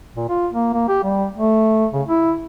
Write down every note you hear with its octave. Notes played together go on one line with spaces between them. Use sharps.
A#2
F4
A#3
A#3
G4
G3
A3
C#3
E4